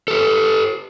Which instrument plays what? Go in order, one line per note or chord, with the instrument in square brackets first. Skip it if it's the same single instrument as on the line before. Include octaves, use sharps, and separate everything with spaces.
[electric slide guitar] G4 A4